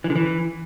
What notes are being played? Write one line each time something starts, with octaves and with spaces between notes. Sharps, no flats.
E3
D3
E3